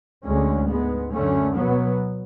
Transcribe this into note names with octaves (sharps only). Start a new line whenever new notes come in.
D2 D3 G#3 C#4
G#2 G#3 B3
F#2 D3 A3 C#4
B2 F#3 B3